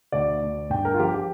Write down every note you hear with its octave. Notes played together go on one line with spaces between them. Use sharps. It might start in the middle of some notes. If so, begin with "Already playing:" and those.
D2 D5
D2
G2 G5
A#4
F4
F3 G4
G4